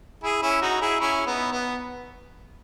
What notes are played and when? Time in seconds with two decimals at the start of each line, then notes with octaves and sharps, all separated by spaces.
0.23 E4 G#4
0.42 C#4 E4
0.62 D#4 F#4
0.81 E4 G#4
1.01 C#4 E4
1.27 B3 D#4
1.52 B3